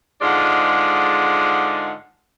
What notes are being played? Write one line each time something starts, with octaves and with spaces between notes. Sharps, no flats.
G#2 D3 G#3 F4 D5 F#5